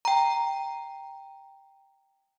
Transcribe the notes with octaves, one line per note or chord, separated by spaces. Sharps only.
G5 A#5